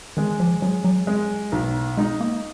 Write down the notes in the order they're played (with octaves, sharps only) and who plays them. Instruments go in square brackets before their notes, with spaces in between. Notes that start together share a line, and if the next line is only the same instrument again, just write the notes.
[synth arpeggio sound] D#3 [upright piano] G#3
[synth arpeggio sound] F3
[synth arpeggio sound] F#3 [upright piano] G#3
[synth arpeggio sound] F#3
[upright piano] G#3
B1
[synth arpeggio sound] G#3 [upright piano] D#4
[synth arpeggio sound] A#3